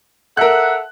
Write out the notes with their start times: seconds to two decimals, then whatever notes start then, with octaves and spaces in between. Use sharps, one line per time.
0.37 A4 A#4 E5 F#5 F#6